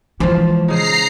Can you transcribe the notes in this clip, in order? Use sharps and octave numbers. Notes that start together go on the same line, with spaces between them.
E3 F3 G#3 C5
C#3 D#4 A#5 C7